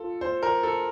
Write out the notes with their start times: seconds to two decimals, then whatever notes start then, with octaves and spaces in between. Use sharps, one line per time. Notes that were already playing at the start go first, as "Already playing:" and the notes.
Already playing: F4 A4
0.21 C5
0.43 A#4
0.63 A4